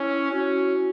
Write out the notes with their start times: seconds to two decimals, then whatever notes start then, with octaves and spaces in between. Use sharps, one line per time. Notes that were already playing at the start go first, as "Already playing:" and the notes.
Already playing: C#4 E4
0.31 C#4 F#4